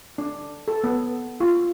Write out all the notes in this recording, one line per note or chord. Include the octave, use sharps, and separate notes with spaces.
D4
A4
B3
F4